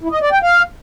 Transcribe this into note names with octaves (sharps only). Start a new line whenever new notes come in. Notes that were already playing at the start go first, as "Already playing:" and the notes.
E4
D#5
D5
G5
F5